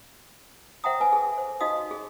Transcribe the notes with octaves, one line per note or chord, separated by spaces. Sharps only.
C5 E5 F#5 G5 A#5 D#6
B4 G#5
G#4 A4
C5
D#4 F#4 D#5 F5 D#6
G#4